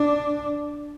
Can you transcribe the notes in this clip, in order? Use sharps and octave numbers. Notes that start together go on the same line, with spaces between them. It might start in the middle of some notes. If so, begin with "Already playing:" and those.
Already playing: D4